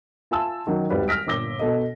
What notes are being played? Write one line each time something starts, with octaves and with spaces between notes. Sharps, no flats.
F4 E5 G#5 A5 E6
D#3 F#3 C#4
D#1 G#1 G3 B4 D5
F6 A#6 B6 D7
G1 A#2 D6 E6 A#6 G7
B2 A4 D#5